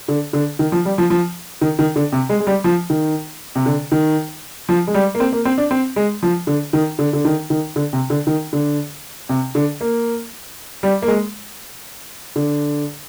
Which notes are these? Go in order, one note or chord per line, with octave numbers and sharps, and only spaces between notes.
D3
D3
D#3
F3
G3
F3
F3
D#3
D#3
D3
C3
G#3
G#3
G3
F3
D#3
C3
D3
D#3
F3
G#3
G3
A#3
C4
A#3
C4
D4
C4
G#3
F3
D3
D#3
D3
D3
D#3
D#3
D3
C3
D3
D#3
D3
C3
D3
A#3
G3
A#3
G#3
D3